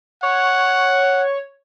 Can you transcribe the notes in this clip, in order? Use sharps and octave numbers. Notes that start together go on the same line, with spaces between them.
C#5 F#5